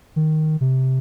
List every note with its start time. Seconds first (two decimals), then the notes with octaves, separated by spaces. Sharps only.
0.16 D#3
0.61 C3